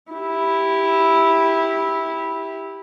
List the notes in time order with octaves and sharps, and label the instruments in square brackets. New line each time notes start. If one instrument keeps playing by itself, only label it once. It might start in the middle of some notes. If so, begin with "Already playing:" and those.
[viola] E4 G4